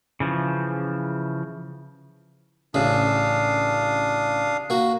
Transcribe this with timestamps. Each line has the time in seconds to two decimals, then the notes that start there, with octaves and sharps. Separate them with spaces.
0.20 C#3 E3 F3
2.74 A1 C#3 D4 F5 D#6
4.70 A#3 F#4